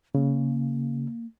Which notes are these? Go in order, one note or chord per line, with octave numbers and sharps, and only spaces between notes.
C#3 A#3